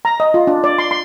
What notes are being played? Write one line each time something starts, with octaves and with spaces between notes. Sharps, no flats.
A#5
D#5
F4
D4
D5
C6
C6